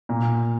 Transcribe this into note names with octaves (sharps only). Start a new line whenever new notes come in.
A#2